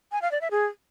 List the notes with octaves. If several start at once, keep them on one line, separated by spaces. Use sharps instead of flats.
G#5
F5
D5
E5
G#4